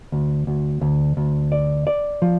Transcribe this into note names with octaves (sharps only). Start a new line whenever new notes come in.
D2
D2
D2
D2
D5
D5
F3